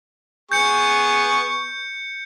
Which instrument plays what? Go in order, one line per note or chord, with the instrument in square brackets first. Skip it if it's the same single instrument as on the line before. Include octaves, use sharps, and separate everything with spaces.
[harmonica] B3 G#4 C#6 [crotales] G6 C#7